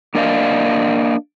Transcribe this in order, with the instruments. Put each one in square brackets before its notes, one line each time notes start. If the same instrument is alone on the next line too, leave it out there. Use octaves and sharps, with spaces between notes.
[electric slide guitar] A#3 D4 A#4 D5 D#5 F5